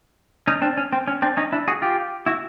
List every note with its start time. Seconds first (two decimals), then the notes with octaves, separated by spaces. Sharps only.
0.47 C#4 D#4
0.62 C4 D4
0.77 C#4
0.93 C4
1.08 C#4
1.22 C4 D4
1.37 C#4 D#4
1.52 D4 E4
1.68 F#4 G#4
1.82 F4 G4
2.26 E4 F#4